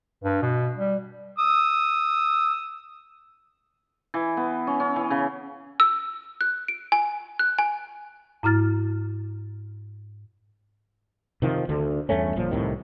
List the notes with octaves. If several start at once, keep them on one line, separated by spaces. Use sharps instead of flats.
G2
B2
G3
D#6 E6
E3
B3
C#4
C#4
E3
C#3
E6
F#6
D7
G#5
F#6
G#5
G#2 E4 A#5 F6 A6
C3 D#3 F3
D2 D3
E2 G2 A3 C#4
G1 A#2 F3
C2 A2 C3 D#3